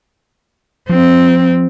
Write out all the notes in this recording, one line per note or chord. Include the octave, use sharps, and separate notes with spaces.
F3 C4